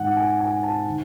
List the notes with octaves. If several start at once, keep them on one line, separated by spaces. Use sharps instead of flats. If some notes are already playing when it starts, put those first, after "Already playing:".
Already playing: G#2 D#3 G#3 F#5
G#5
G#5
A5
D#3